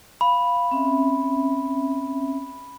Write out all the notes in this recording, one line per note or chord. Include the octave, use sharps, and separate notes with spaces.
F5 B5
C4 C#4 E5